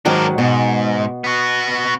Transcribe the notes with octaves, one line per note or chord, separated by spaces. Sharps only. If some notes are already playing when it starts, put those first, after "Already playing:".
G#2 D#3 F#3 D4 A#4
G#2 B2
B3 F#4